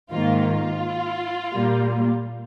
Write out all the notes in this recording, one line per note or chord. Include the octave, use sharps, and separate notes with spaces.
G#2 D#3 A#3 F4
F4
A#2 G3 A#3